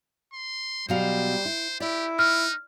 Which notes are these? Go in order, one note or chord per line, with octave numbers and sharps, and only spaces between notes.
C6
B2 F#3 G3 C5 F5
E4
E4 G4 D5
D#4 F6